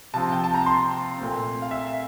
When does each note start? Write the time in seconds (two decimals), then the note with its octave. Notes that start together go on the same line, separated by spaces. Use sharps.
0.14 C3 F3 C4 A5
0.32 G5
0.44 A5
0.54 A#5
0.66 C6
1.18 A#2 A3 C4
1.62 F5
1.71 E5